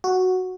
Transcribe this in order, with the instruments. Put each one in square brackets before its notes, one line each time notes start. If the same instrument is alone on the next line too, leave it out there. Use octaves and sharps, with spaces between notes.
[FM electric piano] F#4